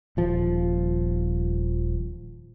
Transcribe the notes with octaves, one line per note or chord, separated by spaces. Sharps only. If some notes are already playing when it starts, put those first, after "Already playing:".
D#1 F3